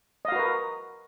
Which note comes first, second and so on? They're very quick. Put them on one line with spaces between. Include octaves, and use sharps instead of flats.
D#5 F5 F#4 B4 A#4